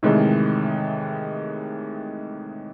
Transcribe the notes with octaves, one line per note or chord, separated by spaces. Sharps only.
A2 C3 D#3 E3 G#3